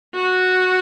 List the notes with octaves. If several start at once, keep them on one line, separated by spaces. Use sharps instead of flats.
F#4